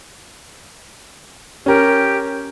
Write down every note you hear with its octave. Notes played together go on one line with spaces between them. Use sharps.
C#4 G4 A#4